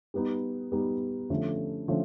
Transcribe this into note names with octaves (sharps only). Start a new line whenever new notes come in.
G3 B3 D#4
G3 B3 D#4
D3 F3 A3 C#4
D3 F3 A3 C#4